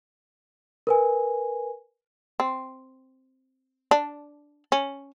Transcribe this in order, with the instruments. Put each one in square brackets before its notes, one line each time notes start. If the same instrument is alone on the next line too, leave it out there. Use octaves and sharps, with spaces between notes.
[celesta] A#4 B4 G#5
[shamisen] C4
D4
C#4